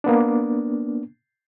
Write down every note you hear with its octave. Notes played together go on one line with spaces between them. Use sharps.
A#3 B3 D4